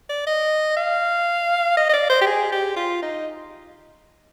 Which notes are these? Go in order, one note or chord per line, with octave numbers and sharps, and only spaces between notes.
D5
D#5
F5
D#5
D#5
D5
C5
G4
G#4
G4
F4
D#4